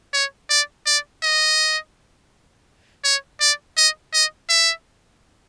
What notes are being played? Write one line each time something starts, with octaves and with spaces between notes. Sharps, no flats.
C#5
D5
D5
D#5
C#5
D5
D#5
D#5
E5